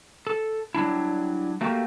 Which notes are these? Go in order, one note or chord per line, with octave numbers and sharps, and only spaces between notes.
A4
F#3 G3 D4 E4
A3 A#3 F#4 G4